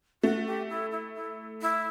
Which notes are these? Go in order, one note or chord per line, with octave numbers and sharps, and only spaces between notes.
A3 F#4
G4
E4
E4
E4
E4